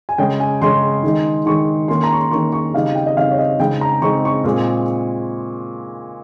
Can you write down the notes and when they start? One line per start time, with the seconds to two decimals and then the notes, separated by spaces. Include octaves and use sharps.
0.09 G#5
0.18 C#3 G#3 C#4 G5
0.40 G#5
0.62 C#3 G#3 C#4 C6
1.03 D#3 G#3 D#4
1.46 D#3 G#3 D#4 C#6
1.88 D#3 A#3 C#4 C6
2.04 A#5
2.12 C#6
2.18 C6
2.31 D#3 A#3 C#4 C#6
2.52 C#6
2.74 C#3 G3 C4 D#4 F5
2.95 G5
3.06 D#5
3.17 C#3 G3 C4 D#4 F5
3.31 C#5
3.38 D#5
3.59 C#3 G#3 C4 D#4 G5
3.81 A#5
4.02 C#3 G#3 C4 D#4 C#6
4.25 C#6
4.44 A#2 G#3 C4